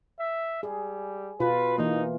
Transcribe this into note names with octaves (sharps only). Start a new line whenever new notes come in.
E5
G3 G#4
B2 F4 B4
E3 A#3 D#4